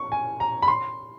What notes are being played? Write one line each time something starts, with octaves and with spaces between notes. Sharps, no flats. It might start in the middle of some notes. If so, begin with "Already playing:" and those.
Already playing: C#6
G#5
A#5
B5
C6